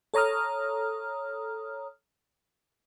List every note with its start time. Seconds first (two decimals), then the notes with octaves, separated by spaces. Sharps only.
0.14 A4 C#5 A#5 D#6 F6